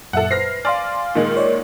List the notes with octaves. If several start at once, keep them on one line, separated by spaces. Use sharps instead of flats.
F#2 A#2 A4 E5 F#5
B4 C5 F6 A#6 C7
D5 F5 G#5 C6 F6
A#2 D#3 G#3
C#5 D5